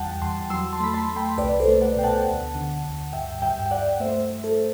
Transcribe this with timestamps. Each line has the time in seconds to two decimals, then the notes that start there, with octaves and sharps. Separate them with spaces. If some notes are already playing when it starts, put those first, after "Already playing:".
Already playing: E2 G3 F#5 G5 A5
0.22 E2 A5 C6
0.50 F#3 C6 E6
0.73 A5 C6
0.80 A3 B5
0.94 A5 C6
1.09 A3
1.16 G5 B5
1.38 C2 B4 D5
1.60 A4 C5
1.68 A3
1.81 D5 F#5
1.96 B2 G5
2.04 F#5 A5
2.26 D2
2.55 D3
2.85 D2
3.13 G2 E5 G5
3.42 G2 E5 G5
3.66 G5
3.71 G2 D5 F#5
4.00 A3 C5 E5
4.30 A3
4.44 A4